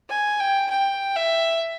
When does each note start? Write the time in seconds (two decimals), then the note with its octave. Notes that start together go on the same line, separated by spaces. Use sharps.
0.09 G#5
0.40 G5
0.70 G5
1.16 E5